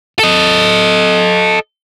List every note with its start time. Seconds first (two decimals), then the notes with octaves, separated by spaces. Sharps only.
0.19 A4 D#5